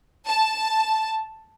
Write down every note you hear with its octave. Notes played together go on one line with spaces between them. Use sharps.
A5